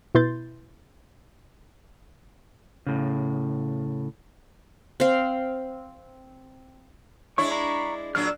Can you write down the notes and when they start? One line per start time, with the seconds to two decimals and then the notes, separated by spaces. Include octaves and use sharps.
0.15 B2 E4 B4 C6 G6 A6
2.87 A2 C#3
5.00 C4 F5
7.38 G#3 D4 E4 C#5 C#6
7.51 A#5 B5 C#6
8.15 A#2 F#3 D4 E6 F6